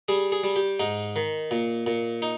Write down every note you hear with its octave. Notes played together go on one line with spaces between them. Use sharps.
G3 G#4
G#4
G3
G4
G#2 D#4
D#3
A#2
A#2
D#4